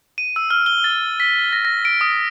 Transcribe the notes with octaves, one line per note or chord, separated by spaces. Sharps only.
D#7
E6
F6
G7
A6
B6
A#6
A#6
D7
D#6